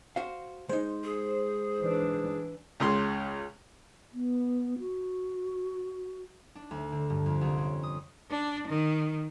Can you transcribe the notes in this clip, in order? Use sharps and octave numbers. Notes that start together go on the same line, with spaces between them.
F#4 C5 F5
G#3 D#4 C5
G#4
E3 D4
C#2 C#3 C6
B3
F#4
D4
D2
D3
G2
F2
C2
C#4
D#6
D4
D#3